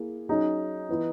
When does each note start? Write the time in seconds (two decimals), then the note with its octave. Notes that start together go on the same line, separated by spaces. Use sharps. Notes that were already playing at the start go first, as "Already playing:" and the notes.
Already playing: A#3 E4 G#4
0.29 F#3 C#4 D#4 G#4
0.89 E3 B3 E4